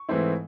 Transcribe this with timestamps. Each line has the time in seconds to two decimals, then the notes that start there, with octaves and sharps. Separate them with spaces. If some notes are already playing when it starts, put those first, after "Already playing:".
Already playing: C#6
0.09 G#2 E3 A3 C4 E4